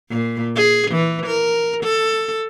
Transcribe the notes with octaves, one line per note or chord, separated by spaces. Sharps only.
A#2
G#4
E3
A#4
A4